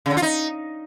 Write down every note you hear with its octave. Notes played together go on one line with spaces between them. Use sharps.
C#3
D3
F4
D#4